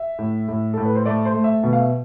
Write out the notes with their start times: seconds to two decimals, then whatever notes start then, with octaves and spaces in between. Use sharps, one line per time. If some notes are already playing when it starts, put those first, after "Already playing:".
Already playing: E5
0.19 A2
0.48 A2
0.74 A2 A4
0.85 B4
0.95 C5
1.05 A3 D5
1.25 C5
1.34 A3
1.44 E5
1.63 B2
1.73 F5
1.80 E5